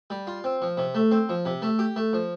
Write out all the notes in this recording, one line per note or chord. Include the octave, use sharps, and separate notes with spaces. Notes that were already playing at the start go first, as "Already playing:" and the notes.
G3
F4
C4
F3
C3
A3
C4
F3
C3
A3
G4
A3
F3